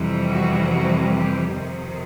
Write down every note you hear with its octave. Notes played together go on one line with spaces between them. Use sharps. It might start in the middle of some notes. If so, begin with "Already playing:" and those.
Already playing: F2 C3 E3 G3
F#4
F#4
G4
F2 C3 D#3